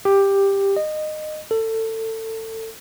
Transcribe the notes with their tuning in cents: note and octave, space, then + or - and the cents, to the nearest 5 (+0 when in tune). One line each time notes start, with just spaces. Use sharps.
G4 +10
D#5 -20
A4 +25